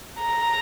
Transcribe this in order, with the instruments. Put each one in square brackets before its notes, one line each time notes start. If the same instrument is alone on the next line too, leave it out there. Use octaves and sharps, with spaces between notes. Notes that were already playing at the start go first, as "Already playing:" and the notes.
[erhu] A#5